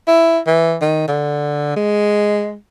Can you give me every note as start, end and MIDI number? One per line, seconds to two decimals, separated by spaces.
0.08 0.39 64
0.47 0.76 52
0.81 1.07 51
1.08 1.74 50
1.76 2.56 56